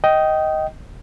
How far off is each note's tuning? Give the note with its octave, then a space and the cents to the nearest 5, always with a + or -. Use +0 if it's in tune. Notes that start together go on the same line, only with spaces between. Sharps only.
D#5 +10 G5 -15